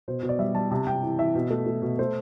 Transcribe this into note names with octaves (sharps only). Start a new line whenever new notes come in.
B2 C5
B2
D5
G3 E5
G3 A5
C3 A5
C3 G5
E3
E3 E5
B2
A3
A3
B2
A3 C5